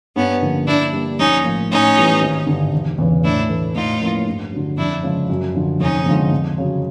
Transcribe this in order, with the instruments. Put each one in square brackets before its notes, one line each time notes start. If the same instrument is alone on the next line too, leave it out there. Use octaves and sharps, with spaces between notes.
[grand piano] G2 [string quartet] B3 C#4
[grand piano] D3 F3 A#3 C#4
[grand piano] A#2 [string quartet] D4 E4
[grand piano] G3 A#3
[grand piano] A#1 [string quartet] C#4 D#4
[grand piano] A2 F3 A#3
[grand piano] A2 [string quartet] C#4 D#4
[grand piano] E3 G3 B3 E4
G#1
G2 D3
E1
E2 C#3 E3
[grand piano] A2 [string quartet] D4 E4
[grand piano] E3 A3
[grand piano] A2 [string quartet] D#4 F4
[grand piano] F3 A#3 C#4 E4
G2
D3 F#3
[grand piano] F2 [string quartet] D4 E4
[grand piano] C#3 F3 G#3
F#2
D3 F3
[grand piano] F1 [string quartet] C#4 D#4
[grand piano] F2 D3 F3 G#3
F2
C#3 F#3